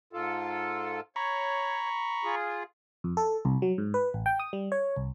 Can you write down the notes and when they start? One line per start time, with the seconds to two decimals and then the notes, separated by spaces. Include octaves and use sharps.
0.13 G#2 F4 A4
1.16 C#5 A#5 B5 C#6
2.24 F4 G#4
3.04 F2
3.17 A4
3.45 C2
3.62 F#3
3.78 G#2
3.94 B4
4.14 A1
4.26 G5
4.40 D#6
4.53 G3
4.72 C#5
4.96 C2